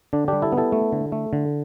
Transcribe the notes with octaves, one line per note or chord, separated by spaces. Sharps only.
D3 D4
G3 D4 G4
E4 A4
B3
E4 A4
A3
D3
A3
D3